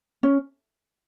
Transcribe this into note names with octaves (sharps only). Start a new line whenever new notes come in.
C#4